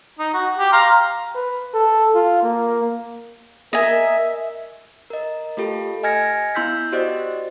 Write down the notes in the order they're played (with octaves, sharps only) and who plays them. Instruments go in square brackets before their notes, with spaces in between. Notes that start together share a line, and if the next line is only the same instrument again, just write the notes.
[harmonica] D#4
F#4
G4
F5 A#5 C6
[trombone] B4
A4
F4
A#3
[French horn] A#4 [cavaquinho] D#5 G#5 [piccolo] E5
[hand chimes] A#4 D#5
A3 F4 G4 A4
D#5 G#5 F6 G#6 A#6 C#7
B3 E4 C6 E6 G6 B6
F#4 G4 C5 D5 D#5